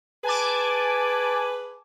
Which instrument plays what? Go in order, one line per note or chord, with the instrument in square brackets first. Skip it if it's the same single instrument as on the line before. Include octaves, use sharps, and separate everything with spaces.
[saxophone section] G#4 B4 [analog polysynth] G#5 A5 D6